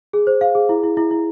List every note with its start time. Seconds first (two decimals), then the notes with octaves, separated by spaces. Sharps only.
0.13 G#4
0.27 C5
0.41 F5
0.55 G#4
0.69 E4
0.83 E4
0.97 E4
1.11 E4